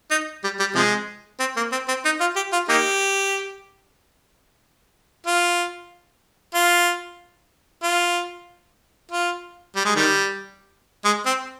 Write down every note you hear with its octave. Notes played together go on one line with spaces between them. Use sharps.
D#4
G3
G3
C3 F3 G#3
C4
A#3
C4
C4
D#4
F4
G4
F4
A#3 D#4 G4
F4
F4
F4
F4
G3
G#3
D#3 G3
G#3
C4